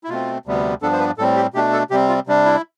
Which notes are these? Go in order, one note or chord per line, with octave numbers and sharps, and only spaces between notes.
E4
B2 A3 C4 F4
D2 C3 G3 B3
G2 F3 B3 D4 A4
C5
B4
A2 G3 C4 A4
G4
B2 A3 D4 G4
A4
C3 G3 C4 G4
F4
C3 G3 D4
E4